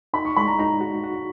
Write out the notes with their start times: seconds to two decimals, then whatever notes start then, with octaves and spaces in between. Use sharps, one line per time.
0.14 D#4 B5
0.25 C#6
0.36 G#3 B5
0.48 A#5
0.59 D#4 A#5
0.81 F#4
1.04 F#4